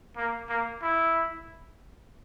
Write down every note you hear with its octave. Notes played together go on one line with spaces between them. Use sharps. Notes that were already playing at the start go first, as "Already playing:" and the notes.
A#3
A#3
E4